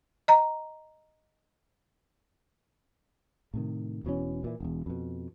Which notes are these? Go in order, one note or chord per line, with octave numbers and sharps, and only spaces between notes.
D#5 A#5
A2 C3 D#3
E1 B2 E3 C#4
A#2 E3
E1 E2
F2 B2